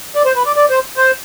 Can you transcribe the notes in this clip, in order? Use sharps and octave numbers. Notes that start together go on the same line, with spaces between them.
D5
C5
B4
D5
D5
C5
C5